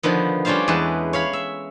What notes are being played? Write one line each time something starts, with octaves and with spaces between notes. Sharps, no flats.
D3 D#3 F3 B3
G3 C#4 D4 F4 C5 F5
E2 G#3 B4 A5
C#5 F5 B5
E5